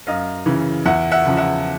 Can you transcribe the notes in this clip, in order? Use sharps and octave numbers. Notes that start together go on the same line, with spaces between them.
F#2 D#5 F5
C#3 E3
E2 E5 F#5
E5 F#5
C#3 F3
E5 F#5